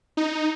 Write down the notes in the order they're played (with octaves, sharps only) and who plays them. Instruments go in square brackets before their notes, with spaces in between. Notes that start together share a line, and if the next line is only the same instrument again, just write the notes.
[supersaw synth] D#4